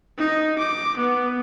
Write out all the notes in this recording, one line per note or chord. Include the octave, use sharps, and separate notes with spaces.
D#4
D6
B3